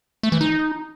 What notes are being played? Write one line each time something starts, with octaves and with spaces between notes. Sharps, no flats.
A3
E3
D#4